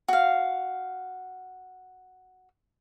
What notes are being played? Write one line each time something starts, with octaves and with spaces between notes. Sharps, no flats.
F#4 F5